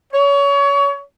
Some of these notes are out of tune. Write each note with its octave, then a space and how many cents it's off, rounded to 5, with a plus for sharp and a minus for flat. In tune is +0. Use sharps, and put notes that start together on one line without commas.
C#5 +25